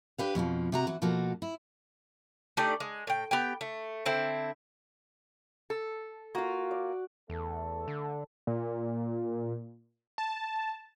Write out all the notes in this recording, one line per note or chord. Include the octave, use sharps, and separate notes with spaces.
D4 G4 B4 F5
F2 B2 D#3 F3
C3 F#4 A#5
E3 F#4
B2 F3 A#3 F#4 A4
E4
A3 D#4 G4 D5
G#3
A2 G5
B3 G4 G5
A3
D3 C4 E4
A4
A#3 F4 F#4
D5
E2 A3 A4
D3
A#2
A5